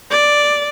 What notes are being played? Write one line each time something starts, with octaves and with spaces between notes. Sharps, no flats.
D5